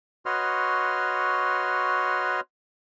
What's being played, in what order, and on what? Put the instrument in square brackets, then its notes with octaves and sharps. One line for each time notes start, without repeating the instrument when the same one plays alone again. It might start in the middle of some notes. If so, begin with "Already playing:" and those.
[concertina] F#4 B4 C#5 D#5 C6 F6